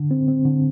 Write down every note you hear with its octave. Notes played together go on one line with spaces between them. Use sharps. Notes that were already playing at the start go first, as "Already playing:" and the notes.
Already playing: D3
C4
C4
D3